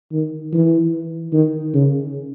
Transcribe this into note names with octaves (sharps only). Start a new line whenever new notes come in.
D#3
E3
D#3
C#3